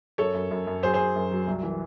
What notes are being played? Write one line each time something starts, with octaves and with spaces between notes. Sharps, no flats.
F#2 A4 C#5
F#2
F#2
F#2
F#3 G#4 C5
G#4 C5
F#2
F#2
F#3
C2
E3